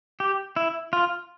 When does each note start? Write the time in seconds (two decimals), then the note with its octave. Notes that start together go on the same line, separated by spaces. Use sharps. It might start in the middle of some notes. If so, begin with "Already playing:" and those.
0.20 G4
0.56 E4
0.93 F4